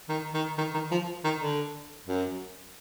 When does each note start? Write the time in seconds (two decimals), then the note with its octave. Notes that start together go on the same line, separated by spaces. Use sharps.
0.09 D#3
0.34 D#3
0.58 D#3
0.74 D#3
0.91 F3
1.24 D#3
1.41 D3
2.07 F#2